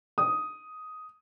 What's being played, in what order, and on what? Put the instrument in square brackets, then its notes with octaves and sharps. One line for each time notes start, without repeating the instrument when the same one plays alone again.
[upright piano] D#6